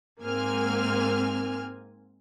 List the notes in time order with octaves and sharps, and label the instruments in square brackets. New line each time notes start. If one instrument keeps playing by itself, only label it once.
[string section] G#2 A#3 C4 G#5 F6